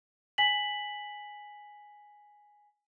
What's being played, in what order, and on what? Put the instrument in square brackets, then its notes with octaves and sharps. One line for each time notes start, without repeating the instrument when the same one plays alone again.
[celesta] G#5 B6 F#7